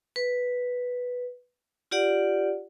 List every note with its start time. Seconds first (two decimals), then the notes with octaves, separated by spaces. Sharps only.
0.16 B4
1.91 F4 G4 D5 F#5